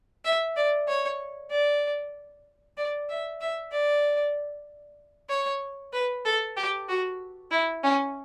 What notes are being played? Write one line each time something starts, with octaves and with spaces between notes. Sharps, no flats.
E5
D5
C#5
D5
D5
E5
E5
D5
C#5
B4
A4
G4
F#4
E4
C#4